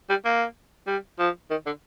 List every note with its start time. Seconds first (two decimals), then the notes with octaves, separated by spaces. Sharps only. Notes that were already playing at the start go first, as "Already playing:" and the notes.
0.09 G3
0.25 A#3
0.87 G3
1.19 F3
1.50 D#3
1.66 D3